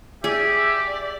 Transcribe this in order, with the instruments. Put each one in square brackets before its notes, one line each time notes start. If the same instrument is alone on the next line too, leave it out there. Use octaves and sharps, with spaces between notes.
[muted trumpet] G4 [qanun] G#4 [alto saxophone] D5 [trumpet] E5